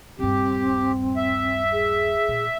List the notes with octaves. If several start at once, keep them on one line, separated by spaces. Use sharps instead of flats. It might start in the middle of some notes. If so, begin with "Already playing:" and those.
D#1 G2 C4 G4
E5
G#4
A#2